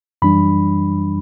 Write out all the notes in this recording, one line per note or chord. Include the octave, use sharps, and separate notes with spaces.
F#2 E3 G3 D4 B5